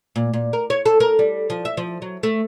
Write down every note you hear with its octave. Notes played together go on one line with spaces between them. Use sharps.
A#2
A#2
A#4
C#5
A4
A#4
G3
F3
E5
F3
F#3
A3